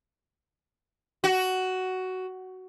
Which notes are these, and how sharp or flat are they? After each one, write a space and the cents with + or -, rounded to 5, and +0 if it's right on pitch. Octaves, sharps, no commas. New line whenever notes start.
F#4 +10